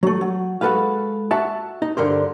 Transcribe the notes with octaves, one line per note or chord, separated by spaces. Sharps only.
F#3 A3
F#3
G#3 F#4 A4 B4 F5
F#4 E5 A5
D#4
G2 D3 A#4 C5